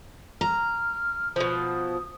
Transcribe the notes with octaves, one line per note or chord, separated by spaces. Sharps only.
A#5 F6
B2 F3 D#6